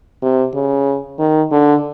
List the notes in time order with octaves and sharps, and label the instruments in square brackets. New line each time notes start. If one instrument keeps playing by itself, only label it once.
[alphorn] C3
C#3
D#3
D3